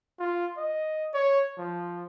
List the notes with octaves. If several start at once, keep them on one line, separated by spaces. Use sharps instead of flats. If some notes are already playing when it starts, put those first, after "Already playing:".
F4
D#5
C#5
F3